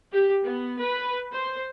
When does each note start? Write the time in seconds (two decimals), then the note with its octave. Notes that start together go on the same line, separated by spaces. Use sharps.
0.13 G4
0.44 B3
0.82 B4
1.33 C5